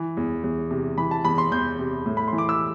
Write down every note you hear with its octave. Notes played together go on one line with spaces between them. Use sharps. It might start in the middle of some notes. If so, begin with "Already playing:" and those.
Already playing: E3
E2
E2
C3
E3 B5
A5
E2 B5
C6
E2 G6
C3
A2
B5
C6
E3
D6
E6